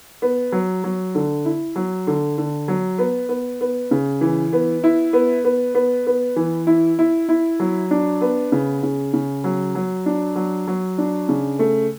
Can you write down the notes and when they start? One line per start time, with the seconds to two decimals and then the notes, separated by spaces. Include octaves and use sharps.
0.22 B3
0.52 F#3
0.84 F#3
1.15 D3
1.45 E4
1.76 F#3
2.07 D3
2.38 D3
2.68 F#3
2.98 B3
3.29 B3
3.61 B3
3.91 C#3
4.21 E3
4.53 B3
4.84 E4
5.13 B3
5.45 B3
5.75 B3
6.07 B3
6.36 E3
6.67 E4
6.99 E4
7.29 E4
7.60 F#3
7.91 D4
8.21 B3
8.52 C#3
8.83 C#3
9.14 C#3
9.44 F#3
9.75 F#3
10.06 D4
10.36 F#3
10.67 F#3
10.98 D4
11.29 C#3
11.59 A3